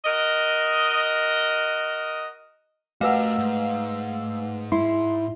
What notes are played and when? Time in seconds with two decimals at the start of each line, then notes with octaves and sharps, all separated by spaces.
0.05 F#4 A#4 D#5
3.01 A3 F#4 A#4 B4 F5 F#5 E6
3.38 G#2
4.72 E4 C6